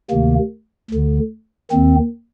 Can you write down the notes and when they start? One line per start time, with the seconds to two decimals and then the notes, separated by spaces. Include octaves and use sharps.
0.10 D2 C3 D#3 A#3
0.91 D2 D3
1.71 D#2 D#3 C4